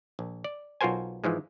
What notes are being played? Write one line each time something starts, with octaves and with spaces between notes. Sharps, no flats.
A#1
D5
B1 F4 F#4 A#4 C5 G#5
G#2 E3 F3 G#3